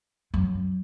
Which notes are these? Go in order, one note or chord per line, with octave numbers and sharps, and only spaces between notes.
F#2